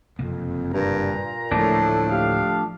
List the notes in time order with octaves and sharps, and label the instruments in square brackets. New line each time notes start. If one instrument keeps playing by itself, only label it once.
[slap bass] F#1 C3 A#3 [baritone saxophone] F2
[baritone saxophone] G2 [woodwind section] A#2 A#5
[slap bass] D1 A#3 [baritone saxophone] A2 [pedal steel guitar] F3 A3 D4
[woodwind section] G4 F5